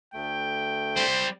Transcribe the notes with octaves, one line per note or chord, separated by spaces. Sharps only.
D2 A3 G5
G3 C4 C5